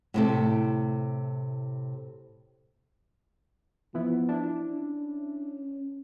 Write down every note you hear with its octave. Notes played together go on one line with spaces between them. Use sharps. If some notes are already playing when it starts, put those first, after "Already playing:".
A2 C3 A3
E3 F3 B3 E4
D4 E4
C#4